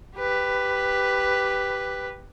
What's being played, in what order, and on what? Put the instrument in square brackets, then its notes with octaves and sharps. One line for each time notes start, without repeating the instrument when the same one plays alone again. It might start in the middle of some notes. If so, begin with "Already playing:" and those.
[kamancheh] G4 B4